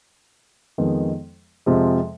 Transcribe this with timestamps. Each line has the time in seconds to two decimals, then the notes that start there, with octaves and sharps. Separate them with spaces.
0.78 F2 D#3 G#3 B3
1.66 F2 C3 F3 G#3